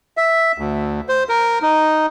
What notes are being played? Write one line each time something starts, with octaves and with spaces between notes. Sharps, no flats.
E5
D2
C5
A#4
D#4